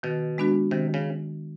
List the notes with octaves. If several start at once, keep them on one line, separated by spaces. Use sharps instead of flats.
B2 D#3
G#3 B3 D4 F#4
C3 D#3
C#3